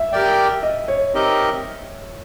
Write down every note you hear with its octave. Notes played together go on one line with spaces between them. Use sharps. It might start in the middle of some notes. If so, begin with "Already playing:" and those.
Already playing: E5
G4 A#4 D5 G5
D#5
C#5
C4 D#4 G4 A#4 D#5